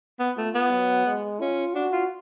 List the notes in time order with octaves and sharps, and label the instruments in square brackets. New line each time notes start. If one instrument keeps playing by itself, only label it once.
[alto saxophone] B3
[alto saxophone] A3 [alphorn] F4
[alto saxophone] B3
[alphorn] F#3
G#3
[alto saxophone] C#4 [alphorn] F4
[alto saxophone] D4 [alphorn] F#4
[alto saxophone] F4